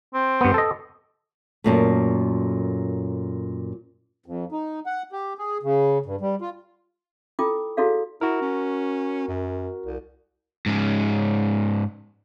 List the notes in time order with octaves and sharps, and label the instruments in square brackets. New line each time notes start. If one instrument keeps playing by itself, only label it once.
[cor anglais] C4
[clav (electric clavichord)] G2 B3
A4 D#5
[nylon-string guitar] F#2 A#2 A3
[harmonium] F2
D#4
F#5
G4
G#4
C#3
G2
G3
F4
[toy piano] E4 F4 A4 G5 D6 D#6
E4 F#4 G#4 A4 D5 F5
[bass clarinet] E4 [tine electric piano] F#4 A#4
[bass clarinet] C#4
F#2
C2
[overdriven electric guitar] G#2 C#4